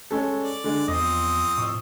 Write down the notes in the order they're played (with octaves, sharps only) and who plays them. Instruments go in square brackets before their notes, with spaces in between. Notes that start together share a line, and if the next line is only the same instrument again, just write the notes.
[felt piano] G#3 C#4 A4
[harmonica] D5
[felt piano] D3 G#3
[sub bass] E2 [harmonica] F3 C4 D#6 [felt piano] D#5
[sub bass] A2 [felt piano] C#6 E6